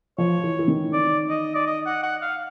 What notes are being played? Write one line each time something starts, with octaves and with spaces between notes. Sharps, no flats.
F3 C#5
E3
E3
D#3
D5
D#5
D5
D#5
F#5
F#5
F5